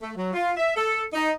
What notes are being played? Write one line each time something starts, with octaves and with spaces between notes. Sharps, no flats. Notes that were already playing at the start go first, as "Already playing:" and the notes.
A3
F#3
F4
E5
A4
D#4